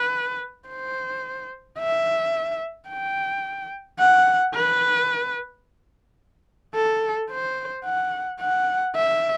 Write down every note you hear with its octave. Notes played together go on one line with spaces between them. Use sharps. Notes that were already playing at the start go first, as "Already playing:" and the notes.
Already playing: B4
C5
E5
G5
F#5
B4
A4
C5
F#5
F#5
E5